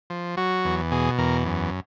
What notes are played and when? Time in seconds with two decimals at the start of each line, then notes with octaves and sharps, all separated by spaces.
0.10 F3
0.37 F#3 F#4
0.65 E2
0.91 B2 G#4
1.18 E2 A#4
1.46 F#2